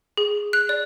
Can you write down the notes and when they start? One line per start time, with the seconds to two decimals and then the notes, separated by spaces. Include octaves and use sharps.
0.17 G#4
0.53 F#6
0.69 D5